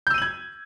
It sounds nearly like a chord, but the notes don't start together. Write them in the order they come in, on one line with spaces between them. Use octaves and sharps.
G6 E6 D#7 F#7 G#6